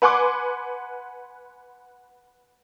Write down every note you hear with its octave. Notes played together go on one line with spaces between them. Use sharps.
B4 F#5 G#5 C6 D6